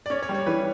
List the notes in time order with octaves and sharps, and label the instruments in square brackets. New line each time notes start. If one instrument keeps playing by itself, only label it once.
[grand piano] D5
[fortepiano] C#4 [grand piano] C#5
[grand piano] C#5
[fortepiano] G3
[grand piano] C#5
[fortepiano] E3 [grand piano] B4